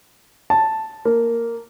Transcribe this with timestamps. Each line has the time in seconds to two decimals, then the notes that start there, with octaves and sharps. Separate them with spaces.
0.50 A5
1.05 A#3